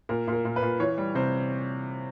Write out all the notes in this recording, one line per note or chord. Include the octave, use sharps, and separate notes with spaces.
A#2 A#4
A#2
A#4
A#2
B4
A#2
E3 C#5
G3
C3 C5